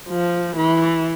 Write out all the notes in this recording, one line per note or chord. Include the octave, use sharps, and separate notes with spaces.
F3
E3